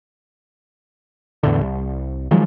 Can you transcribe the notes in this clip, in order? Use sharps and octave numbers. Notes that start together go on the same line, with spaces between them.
E2 A2 D3
C2
D#3 F3 F#3 G#3